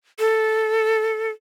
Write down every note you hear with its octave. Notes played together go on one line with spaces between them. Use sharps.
A4